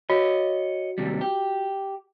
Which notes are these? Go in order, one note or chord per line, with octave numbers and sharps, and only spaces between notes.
F#4 C#5 D#5
D#2 C3 G3
G4